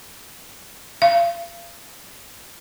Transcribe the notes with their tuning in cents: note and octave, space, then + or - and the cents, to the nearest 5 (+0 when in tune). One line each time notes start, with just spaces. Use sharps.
F5 -35